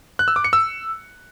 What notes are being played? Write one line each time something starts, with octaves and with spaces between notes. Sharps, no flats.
F#6
E6
D6
C#7
E6